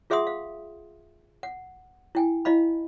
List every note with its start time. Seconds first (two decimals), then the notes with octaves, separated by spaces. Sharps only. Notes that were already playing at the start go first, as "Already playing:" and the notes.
0.10 F4 G#4 E5 F#5 C6 D#6
0.27 F5
1.43 F#5
2.15 E4 G5 G#5
2.45 E4 D#5 F5 B5